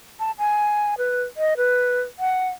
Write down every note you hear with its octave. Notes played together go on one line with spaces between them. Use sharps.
A5
G#5
B4
D#5
B4
F#5